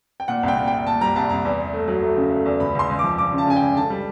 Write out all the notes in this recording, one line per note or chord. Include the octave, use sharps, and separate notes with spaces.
G5
A#2 F#5
C2
G5
A#2
C2 G5
A#2 A5
G3 A#5
C2 A5
C2 A#5
E2
E2
A3
F#3
A3
C#3
A3
E2
C#2 B5
C#2 C6
C#2
F3 D6
C#2 D6
C#3
A5
C#3 G#5
G5
C#2
D3 A5
G3